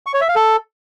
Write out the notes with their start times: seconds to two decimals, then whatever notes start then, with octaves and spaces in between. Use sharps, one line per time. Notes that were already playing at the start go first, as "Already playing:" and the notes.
0.06 C#6
0.14 C#5
0.21 E5
0.28 F5
0.36 A4